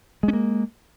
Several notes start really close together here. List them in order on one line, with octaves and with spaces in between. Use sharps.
G#3 C#4 A#3